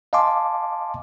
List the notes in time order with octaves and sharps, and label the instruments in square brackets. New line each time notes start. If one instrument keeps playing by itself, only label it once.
[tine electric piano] D#5 F5 G#5 A5 C6 D6